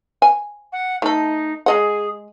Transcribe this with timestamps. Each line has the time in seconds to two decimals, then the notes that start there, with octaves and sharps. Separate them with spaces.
0.22 G#5
0.72 F#5
1.02 A3 D#4 A4
1.66 G#3 G#4 D#5 F#5